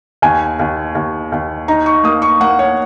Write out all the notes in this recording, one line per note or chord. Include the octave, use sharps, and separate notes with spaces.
D#2 G#5
D#2
D#2
D#2
D#4 A#5
C#6
A#3 D#6
C#6
A#3 F#5
C#5